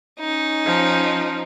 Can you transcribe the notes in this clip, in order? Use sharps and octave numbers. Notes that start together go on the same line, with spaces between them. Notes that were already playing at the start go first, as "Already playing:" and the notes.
C#4 D#4
F3